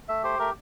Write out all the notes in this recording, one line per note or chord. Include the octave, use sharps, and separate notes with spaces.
A3 E5
G4 C5
A3 A#4